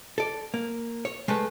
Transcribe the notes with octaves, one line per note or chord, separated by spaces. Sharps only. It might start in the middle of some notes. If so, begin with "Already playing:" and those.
A4 D5
A#3
C#5
G#3 A3 A4 B4